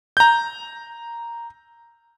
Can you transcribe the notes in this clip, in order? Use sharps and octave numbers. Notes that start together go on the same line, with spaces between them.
A#5 G6